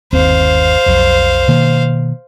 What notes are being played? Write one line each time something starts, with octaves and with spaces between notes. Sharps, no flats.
G1 D#2 C4 C5 F5
B1 F2
B2 D#3 A#3